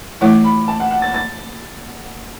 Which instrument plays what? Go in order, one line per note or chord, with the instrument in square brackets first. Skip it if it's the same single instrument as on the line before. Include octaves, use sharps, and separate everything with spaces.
[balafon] E3 A3 E4 [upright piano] D6
[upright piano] B5
A5
F#5
F#5
A6
A6